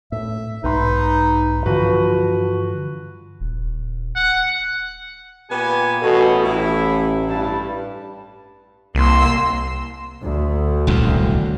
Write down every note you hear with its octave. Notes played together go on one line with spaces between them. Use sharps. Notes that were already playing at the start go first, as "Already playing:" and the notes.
A2 E5
B1 G#2 D#4 B4 B5 C6
G2 D3 E3 F3 F#4 B4
D#1
F#5
A#2 B3 G4 G#5
A1 B2 C#4 D#4 F#4 A4
A1 A2 E4
G2 G3 B4 A5
C2 A#3 C6 E6
D2
D#1 C2 F#2